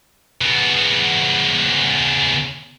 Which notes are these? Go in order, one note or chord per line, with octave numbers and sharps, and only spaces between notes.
C#3 B3